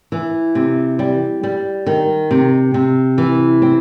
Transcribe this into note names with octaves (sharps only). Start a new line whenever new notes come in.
E3
C3
G3
G3
D#3
C3
C3
E3
C4